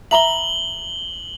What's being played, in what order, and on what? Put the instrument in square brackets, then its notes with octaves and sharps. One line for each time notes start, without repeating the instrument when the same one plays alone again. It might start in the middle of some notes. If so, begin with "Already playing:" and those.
[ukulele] E5 A#5 B5 [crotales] F#7 G7